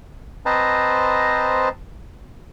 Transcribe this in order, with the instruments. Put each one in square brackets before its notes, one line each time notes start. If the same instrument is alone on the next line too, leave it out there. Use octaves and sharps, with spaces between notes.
[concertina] C4 B4 C5 D#5 A5 A#5